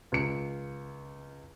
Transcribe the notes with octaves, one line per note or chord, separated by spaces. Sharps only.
C#2 C#7